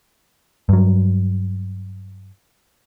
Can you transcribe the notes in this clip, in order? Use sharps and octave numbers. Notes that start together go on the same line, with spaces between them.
G2 F#3